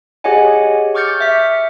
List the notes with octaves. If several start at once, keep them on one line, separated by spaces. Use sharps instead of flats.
G4 G#4 C#5 D#5 F#5 G#5
C#6 D6 F6 G6 A6 C#7
E5 B6